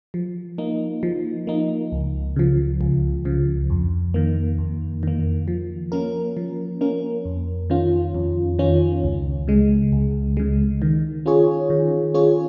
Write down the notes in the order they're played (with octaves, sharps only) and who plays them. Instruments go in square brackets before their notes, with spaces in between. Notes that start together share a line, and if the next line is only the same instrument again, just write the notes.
[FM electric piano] F3
A#3 D#4
F3
A#3 D#4
C#2
C#3 F3
C#2
C#3 F3
F2
D#3 A#3
F2
D#3 A#3
F3
A#3 C#4 A#4
F3
A#3 C#4 A#4
F2
D#3 C#4 F4
F2
D#3 C#4 F4
C#2
C#3 G#3
C#2
C#3 G#3
D#3
C#4 F4 G#4 C#5
D#3
C#4 F4 G#4 C#5